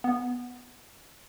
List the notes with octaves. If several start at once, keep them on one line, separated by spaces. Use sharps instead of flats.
B3